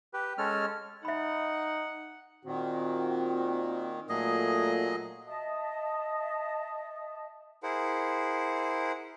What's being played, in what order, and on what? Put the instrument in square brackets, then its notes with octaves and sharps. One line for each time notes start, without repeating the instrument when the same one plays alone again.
[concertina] G4 B4
G#3 C#4 A4 F6
[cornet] D#4 [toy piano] E5 B5 [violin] F#5
[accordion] A#2 D#3 [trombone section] C4 F#4
[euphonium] A#2 [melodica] F#3 G#4 D#5 [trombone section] A3
[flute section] D#5 E5 A5 D#6
[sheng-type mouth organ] E4 G#4 A#4 C5 F#5